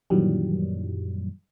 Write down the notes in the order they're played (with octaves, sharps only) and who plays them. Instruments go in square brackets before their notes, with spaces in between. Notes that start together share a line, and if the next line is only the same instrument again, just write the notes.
[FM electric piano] F#2 A#2 D#3 E3 F#3 G3